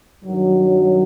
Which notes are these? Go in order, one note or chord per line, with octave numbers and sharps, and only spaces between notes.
G2 D#3 F#3